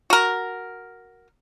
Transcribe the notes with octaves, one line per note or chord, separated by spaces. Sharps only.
F#4 A#4